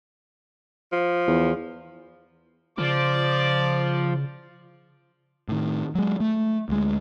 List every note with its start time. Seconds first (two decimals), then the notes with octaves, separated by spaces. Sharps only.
0.92 F3
1.27 E2
2.78 C#3 F3 D5 D6
5.48 A2 D#3
5.95 F#3 G#3
6.20 A3
6.69 D2 G#3